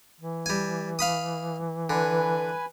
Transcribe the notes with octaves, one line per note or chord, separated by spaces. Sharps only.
E3
G3 G#5
F5 B5 D#6
D3 B4 G#5